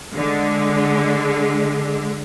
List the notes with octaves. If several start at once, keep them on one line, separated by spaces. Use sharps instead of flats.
D3 G#3